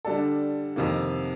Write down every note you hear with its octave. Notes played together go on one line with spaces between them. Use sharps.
D3 G3 D4 A4
F2 C3 D#3 A#3